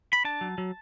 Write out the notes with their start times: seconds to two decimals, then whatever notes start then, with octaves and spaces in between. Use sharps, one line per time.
0.13 B5
0.24 D4 A5
0.41 F#3
0.58 F#3